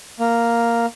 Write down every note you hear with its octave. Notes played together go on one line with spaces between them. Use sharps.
A#3